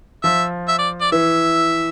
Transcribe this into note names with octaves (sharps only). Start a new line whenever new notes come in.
F3 E5
E5
D5
D5
E3 E5